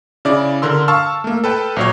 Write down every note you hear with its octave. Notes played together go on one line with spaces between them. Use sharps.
C#3 D4 E4 D5
D3 A#4 C6 E6
F5 A5 C#6 E6 F6
A3 A#3
A4 B4 G5 A5
A#1 F#3 C#5